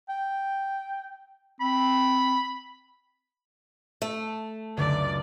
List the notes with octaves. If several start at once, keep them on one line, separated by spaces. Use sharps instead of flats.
G5
C4 B5
A3
C#2 F#2 D3 D5